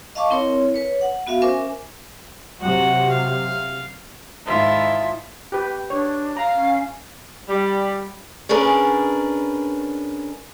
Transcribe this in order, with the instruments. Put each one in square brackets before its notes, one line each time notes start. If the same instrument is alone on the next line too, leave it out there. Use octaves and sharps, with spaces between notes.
[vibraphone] D#5 F5 A5 C#6 D6
C4 E4 A#4 C#5
B4 C#5
F#5
B3 F#4 E5 F5
C#4 A#4 C5 E5 G#5 D6
[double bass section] C3 F#3 [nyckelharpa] F#4 F#5
[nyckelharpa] F5
[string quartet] G#2 D#3 E4 F4 E5 A5
[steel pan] G4 B4
[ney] D4 [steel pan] C#5
[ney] F5 [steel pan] A#5
[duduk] C#4
[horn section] G3
[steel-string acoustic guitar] C#4 D4 G#4 A#4 B4